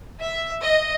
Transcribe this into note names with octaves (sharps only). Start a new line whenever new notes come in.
E5
D#5